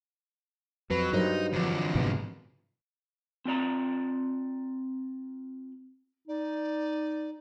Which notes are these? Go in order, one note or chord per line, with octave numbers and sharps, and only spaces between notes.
F2 F#3 B4
G2 F#3 D#4 A#4 C5
F2 D3 E3 F3
G#2 C3 B3
C4 F4 D5 A#5
D#4 D5